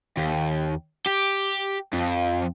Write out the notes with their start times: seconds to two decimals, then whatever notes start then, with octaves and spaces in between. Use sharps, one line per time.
0.17 D#2
1.06 G4
1.93 F2